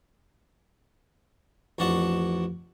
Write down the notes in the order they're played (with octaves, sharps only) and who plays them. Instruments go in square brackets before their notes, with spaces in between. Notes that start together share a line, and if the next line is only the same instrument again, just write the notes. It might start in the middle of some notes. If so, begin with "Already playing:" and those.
[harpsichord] A1 F2 D4 F#4 F#5 A5